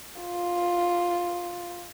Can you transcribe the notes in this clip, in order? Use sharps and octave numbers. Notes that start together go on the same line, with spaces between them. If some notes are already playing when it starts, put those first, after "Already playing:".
F4